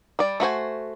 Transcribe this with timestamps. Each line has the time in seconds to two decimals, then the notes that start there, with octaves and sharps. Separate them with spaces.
0.19 G3 D5
0.40 A3 F#4 C5 G#5